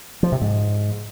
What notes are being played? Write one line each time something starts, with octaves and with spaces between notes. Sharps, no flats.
F3
C3
G#2